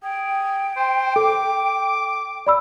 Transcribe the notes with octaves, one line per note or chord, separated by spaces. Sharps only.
G#4 G5
C5
A4 D6
D5 B5 E6